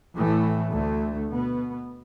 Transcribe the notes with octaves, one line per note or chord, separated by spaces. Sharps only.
A2 E3 A3
D2 D3 A3
B2 B3